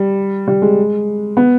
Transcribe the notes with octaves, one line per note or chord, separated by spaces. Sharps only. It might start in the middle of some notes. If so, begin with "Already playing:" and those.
Already playing: G3
G3
G#3
B3